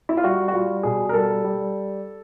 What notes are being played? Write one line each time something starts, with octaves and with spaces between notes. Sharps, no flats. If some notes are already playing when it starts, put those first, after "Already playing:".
E4
F4
G3 F#4
F#4
G3 F4
B2 G#4
A#4
G3 A4
G3